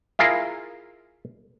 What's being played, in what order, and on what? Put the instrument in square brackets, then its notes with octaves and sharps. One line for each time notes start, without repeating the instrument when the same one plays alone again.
[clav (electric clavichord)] E4 F4 G#4 A#4 F5